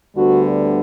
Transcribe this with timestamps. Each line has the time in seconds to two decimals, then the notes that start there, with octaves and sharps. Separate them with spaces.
0.16 D2 D3 G3 B3 F#4